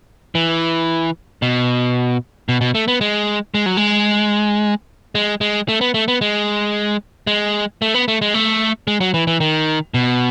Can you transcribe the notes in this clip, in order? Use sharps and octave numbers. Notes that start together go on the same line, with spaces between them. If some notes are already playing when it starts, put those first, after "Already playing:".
E3
B2
B2
B2
A3
B3
G#3
G#3
F#3
G#3
G#3
G#3
A3
B3
A3
B3
G#3
G#3
A3
B3
A3
G#3
A3
G#3
F#3
E3
E3
D#3
B2